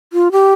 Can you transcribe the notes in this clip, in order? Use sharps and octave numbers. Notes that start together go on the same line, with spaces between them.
F4
G4